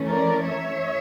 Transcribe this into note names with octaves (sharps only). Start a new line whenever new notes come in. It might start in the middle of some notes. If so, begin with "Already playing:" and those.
Already playing: E3 A3 C#4
A#4 D5
C#5 E5